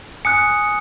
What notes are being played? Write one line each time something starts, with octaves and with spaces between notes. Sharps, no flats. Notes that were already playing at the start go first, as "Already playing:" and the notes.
G#5 D#6 F#6 C#7